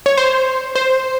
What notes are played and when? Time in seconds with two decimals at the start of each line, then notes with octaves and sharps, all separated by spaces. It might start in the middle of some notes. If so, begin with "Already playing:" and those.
0.06 C#5
0.18 C5
0.75 C5